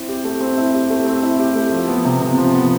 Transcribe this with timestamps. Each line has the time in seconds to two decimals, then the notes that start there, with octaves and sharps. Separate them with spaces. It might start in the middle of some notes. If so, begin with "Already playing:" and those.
Already playing: C4 E4
0.08 G4
0.24 A3
0.41 C4
0.57 E4
0.74 G4
0.90 A3
1.06 C4
1.23 E4
1.39 G4
1.56 A3
1.72 F3
1.89 B3
2.05 C3
2.21 C3
2.38 F3
2.54 B3